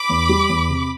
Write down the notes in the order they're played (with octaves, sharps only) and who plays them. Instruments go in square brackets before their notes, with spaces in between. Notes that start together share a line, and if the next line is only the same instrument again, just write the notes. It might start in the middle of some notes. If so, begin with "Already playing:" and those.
Already playing: [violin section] B5 D6
[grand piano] E2
G3
E2
C3